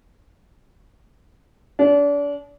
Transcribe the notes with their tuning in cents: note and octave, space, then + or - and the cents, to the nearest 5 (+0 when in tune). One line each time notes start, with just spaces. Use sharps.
D4 -35